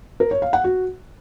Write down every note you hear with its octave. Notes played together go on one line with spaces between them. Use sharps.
A#4
C#5
F5
F#5
F#4